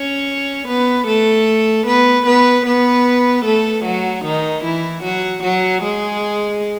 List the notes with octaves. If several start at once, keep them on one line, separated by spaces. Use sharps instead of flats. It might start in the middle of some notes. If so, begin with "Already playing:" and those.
Already playing: C#4 C#5
B3 B4
A3 A4
B3 B4
B3 B4
B3 B4
A3 A4
F#3 F#4
D#3 D#4
E3 E4
F#3 F#4
F#3 F#4
G#3 G#4